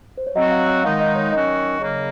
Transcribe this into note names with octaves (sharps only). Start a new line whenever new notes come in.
C5
C#5
F#3 C4 F#4 D#5
F5
F#5
D#3 G#3 D#4 F5
D#5
C#5
D#3 F#3 C#4 F#4 D#5
C#3 F#3 A#3